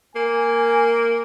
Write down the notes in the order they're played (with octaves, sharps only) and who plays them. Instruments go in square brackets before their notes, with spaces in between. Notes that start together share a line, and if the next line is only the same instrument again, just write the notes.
[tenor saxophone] A#3 [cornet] G#5